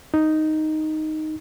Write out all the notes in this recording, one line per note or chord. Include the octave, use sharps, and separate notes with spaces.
D#4